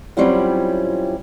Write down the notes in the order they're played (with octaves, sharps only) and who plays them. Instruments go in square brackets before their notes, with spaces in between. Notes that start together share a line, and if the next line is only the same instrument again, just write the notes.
[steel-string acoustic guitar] F#3 G3 C4 C#4 E4 F4